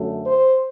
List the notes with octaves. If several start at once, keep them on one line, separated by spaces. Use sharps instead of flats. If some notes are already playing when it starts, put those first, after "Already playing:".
Already playing: F#2 D3 F#3 A3
C5